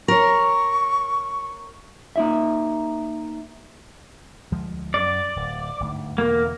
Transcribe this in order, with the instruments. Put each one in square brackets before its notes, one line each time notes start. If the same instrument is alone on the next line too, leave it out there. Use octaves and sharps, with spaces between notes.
[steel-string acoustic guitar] A#4 C#5 [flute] C#6
[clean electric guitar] A#3 D#4 E5
[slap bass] D2 F3 G#3
[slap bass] F#2 [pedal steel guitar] D5
[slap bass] D1
G1 D2 G#2
[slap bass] E2 B2 D3 [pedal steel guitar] A#3